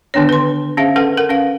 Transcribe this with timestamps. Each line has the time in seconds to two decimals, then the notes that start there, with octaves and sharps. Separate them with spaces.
0.14 D3 D#3 B3 D4 C#5
0.29 B4 C6
0.77 C#4 G#4 C5 E5 F5
0.96 C#4 A4 B4 F#5
1.17 A#4 F#5
1.29 C#4 B4 F5